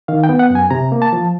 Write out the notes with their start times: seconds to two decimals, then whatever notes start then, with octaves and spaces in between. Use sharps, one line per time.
0.08 D#3 F5
0.24 G5
0.29 B3
0.39 F#5
0.50 F#2 G#5
0.71 C3 A#5
0.92 A#3
1.02 A5
1.13 F3